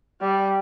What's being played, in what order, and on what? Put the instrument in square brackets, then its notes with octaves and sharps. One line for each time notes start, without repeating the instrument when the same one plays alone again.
[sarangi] G3